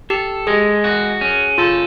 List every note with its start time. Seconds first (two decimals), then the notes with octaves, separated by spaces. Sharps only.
0.10 G4 A4
0.47 G#3 G#4
0.84 F#4
1.21 C#4
1.58 F4 A4